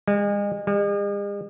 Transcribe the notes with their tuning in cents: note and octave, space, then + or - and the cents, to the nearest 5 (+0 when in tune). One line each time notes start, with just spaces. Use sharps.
G#3 -35
G#3 -45